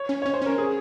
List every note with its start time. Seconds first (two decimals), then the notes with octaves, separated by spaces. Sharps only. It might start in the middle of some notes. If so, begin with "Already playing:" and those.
Already playing: C#5
0.09 C#4
0.22 C#4 C#5
0.34 C5
0.42 C#4 A#4
0.58 G#4